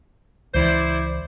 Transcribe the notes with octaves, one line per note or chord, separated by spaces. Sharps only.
C#2 E3 E4 C5 D5